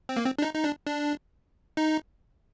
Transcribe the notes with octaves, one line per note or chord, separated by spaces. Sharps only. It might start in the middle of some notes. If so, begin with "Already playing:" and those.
C4
A#3
C4
D4
D#4
D#4
D4
D4
D#4